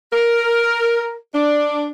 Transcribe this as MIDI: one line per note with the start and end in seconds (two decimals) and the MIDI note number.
0.13 1.15 70
1.34 1.91 62